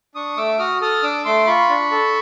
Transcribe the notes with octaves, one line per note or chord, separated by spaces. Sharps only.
D4 C#6 D#6
A3 D6 E6
F#4 D#6 F6
A4 D#6 F6
D4 D6 E6
A3 C6 D6
F4 B5 C#6
D4
A4